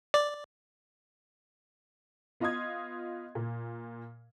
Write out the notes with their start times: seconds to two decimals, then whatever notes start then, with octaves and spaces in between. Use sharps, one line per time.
0.14 D5
2.40 B3 F4 D#5 C6 D#6 G#6
3.35 A#2